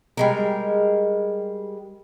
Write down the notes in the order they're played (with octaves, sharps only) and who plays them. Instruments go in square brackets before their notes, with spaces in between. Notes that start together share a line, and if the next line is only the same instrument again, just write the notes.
[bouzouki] G3 G#3 A#4